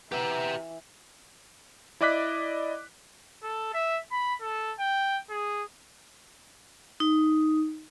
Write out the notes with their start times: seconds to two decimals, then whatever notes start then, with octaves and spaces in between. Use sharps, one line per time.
0.12 E3 B3 G4 E5 A#5
2.01 E4 D5 D#5 D6 F#6 B6
3.43 A4
3.74 E5
4.11 B5
4.41 A4
4.79 G5
5.30 G#4
7.00 D#4